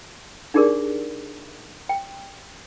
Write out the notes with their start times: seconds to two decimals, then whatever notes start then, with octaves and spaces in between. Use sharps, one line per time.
0.54 D4 D#4 G4 G#4 A#4 D5
1.89 G5